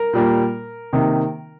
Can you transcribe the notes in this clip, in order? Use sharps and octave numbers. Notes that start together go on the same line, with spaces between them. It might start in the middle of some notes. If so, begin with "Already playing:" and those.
Already playing: A#4
A#2 G3 A#3
C3 D#3 A#3